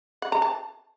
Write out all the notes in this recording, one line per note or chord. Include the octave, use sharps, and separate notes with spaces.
F#5
A#5
A5